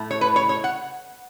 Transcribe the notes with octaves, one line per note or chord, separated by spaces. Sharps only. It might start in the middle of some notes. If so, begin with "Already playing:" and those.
Already playing: A2 A3
C#5
B4
C#5
C#5
F#5